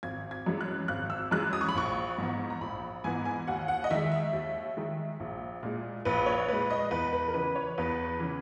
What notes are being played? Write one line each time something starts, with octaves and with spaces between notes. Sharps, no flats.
G#1 G#6
G#6
F#2 E3 G#3
F#6
G#1 F#6
E6
F#2 E3 G#3 F#6
D#6
C#6
B5
A#1 C#6
G#2 E3 B3
A#5
A#1 B5
G#2 E3 B3 G#5
G#5
D#2 F#5
F#5
D#5
D#3 G#3 E5
E5
D#2
D#3 G#3
A#1
A#2 G#3
A#1 B4
C#5
A#2 G#3 B4
D#5
E2 B4
B4
A#4
C#3 E3 B4
C#5
E2 B4
C#3 E3